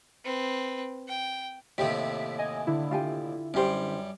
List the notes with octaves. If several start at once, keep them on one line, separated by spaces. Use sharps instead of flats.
C4 B4
G5
D#2 A2 C3 G4 B6
D#5 G#5
D3 E4
F4 G4 G#5
F#2 G3 C#4 G4 C5